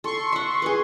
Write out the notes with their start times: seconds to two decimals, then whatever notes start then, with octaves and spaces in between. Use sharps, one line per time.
0.04 A4 C6 C#6
0.32 E5 F#5
0.62 G#4 B4